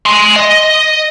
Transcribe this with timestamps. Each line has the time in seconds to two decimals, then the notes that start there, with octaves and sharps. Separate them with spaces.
0.06 G#5 C6
0.36 D#5